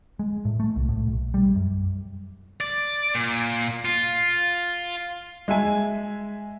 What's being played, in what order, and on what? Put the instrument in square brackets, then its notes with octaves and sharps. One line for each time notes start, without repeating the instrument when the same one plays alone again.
[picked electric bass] G#3
A2
A3
C2
A2
B1
G3
F#2
[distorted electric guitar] D5
A#2
F4
[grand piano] G#3 E5 G#5